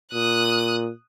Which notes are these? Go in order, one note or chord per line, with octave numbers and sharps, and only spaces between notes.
A#2 D#6 F#6